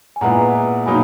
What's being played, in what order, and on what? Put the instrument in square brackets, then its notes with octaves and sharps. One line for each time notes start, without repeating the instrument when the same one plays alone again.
[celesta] G#5
[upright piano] A#2 G#3 B3 E4 B4 [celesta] F#5 A#5
[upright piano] B2 F#3 A#3 D#4 [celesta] G#5 B5